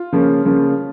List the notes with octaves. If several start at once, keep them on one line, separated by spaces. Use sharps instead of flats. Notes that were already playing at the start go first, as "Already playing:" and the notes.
Already playing: F4
C#3 F3 A#3 C#4
C#3 F3 A#3 C#4